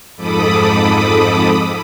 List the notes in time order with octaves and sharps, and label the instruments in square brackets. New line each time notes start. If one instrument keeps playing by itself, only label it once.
[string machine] F2 G#2 A4 B5 D6 D#6